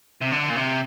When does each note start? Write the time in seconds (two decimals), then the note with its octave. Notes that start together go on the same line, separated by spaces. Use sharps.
0.22 C3
0.32 D3
0.50 A#2
0.56 C3